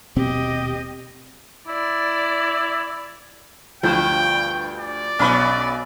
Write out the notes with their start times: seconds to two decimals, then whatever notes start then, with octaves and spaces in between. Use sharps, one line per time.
0.16 D#1 B2 C4 G4 D#5
1.68 E4 D5
3.83 D2 G2 F3 G5 G6
4.79 D5
5.19 B1 B3 C#4 B5